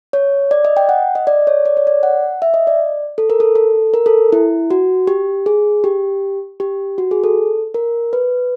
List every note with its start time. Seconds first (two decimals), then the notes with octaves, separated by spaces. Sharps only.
0.13 C#5
0.51 D5
0.65 D#5
0.77 G5
0.89 F#5
1.15 D#5
1.27 D5
1.47 C#5
1.66 D5
1.77 C#5
1.87 D5
2.03 F#5
2.42 E5
2.54 D#5
2.67 D5
3.18 A4
3.30 A#4
3.40 A4
3.55 A4
3.94 A#4
4.06 A4
4.32 E4
4.71 F#4
5.07 G4
5.46 G#4
5.84 G4
6.60 G4
6.98 F#4
7.11 G#4
7.24 A4
7.74 A#4
8.13 B4